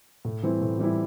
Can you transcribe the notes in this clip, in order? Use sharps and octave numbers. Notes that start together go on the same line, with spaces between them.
A2
E3 G3 C4 E4
A2
E3 G3 C4 E4